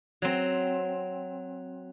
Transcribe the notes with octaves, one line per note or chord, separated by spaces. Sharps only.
F#3 C4